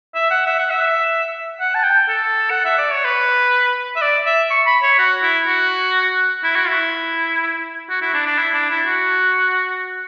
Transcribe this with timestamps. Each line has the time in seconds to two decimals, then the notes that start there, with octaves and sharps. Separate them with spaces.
0.15 E5
0.31 F#5
0.47 E5
0.59 F#5
0.70 E5
1.60 F#5
1.75 A5
1.83 G5
2.09 A4
2.50 F#5
2.65 E5
2.78 D5
2.92 C#5
3.05 B4
3.96 E5
4.02 D5
4.26 E5
4.50 C#6
4.66 B5
4.83 C#5
4.99 F#4
5.23 E4
5.47 F#4
6.44 E4
6.56 F#4
6.69 E4
7.90 F#4
8.02 E4
8.14 D4
8.26 D4
8.38 E4
8.54 D4
8.70 E4
8.87 F#4